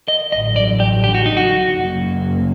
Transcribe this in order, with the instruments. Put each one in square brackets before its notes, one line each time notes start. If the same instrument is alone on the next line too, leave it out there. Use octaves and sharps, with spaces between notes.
[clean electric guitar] D#5
[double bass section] A1 G2 D3 F#3 [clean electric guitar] D#5
[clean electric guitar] D5
G4
G4
F#4
D#4
F#4
[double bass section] F#1 F#2 F#3 A#3